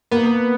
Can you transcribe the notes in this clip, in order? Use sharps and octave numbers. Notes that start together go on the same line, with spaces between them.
A#3 B3